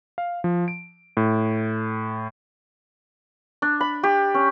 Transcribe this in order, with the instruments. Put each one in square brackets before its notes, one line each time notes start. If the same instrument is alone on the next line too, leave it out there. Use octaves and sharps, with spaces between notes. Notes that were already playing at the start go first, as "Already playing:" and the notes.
[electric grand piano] F5
F3
D7
A2
[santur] D4
B5
G4
C#4